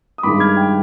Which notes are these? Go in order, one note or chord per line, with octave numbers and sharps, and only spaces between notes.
D#6
G2 D#3 G#3 B5 D6
F6 G#6
G5 B5